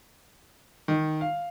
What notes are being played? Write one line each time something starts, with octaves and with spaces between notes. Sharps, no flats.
D#3
F5